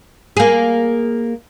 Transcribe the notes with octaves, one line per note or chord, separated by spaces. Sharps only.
A#3 G#4